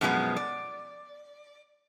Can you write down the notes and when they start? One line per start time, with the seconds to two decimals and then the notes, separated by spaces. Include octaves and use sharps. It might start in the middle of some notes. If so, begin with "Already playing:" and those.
0.01 F#2 B2 F3 G#3 B3
0.36 D5